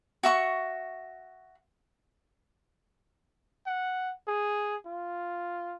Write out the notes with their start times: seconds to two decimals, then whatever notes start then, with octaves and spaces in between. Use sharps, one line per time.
0.23 F#4 E5 C#6
3.66 F#5
4.28 G#4
4.86 F4